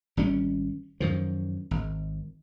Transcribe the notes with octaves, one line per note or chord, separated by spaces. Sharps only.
G#1 G3 C#4
F#2 D#3 F3
G#1